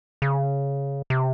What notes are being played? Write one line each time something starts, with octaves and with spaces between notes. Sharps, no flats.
C#3
C3